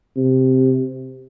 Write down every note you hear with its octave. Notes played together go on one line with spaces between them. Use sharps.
C3